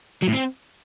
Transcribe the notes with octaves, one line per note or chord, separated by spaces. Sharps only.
F#3
A2
C4